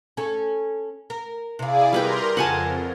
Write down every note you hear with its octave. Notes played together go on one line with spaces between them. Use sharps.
C#4 A4
A#4
C3 E4 G#4 D5 F5
G3 A#4 B4 G5 A#5 C6
F2 C#3 F#5 G#5 A5